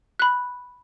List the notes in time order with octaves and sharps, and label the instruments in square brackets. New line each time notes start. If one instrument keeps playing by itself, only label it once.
[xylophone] B5 F#6